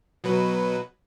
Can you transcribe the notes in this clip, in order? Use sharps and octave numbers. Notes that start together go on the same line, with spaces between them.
B2 F#3 B4